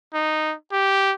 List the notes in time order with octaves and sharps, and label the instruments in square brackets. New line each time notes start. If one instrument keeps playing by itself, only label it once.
[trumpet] D#4
G4